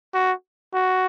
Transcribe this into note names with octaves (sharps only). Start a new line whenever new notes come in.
F#4
F#4